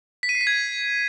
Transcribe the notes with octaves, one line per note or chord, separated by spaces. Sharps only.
B6
D#7
C7
B6
G#6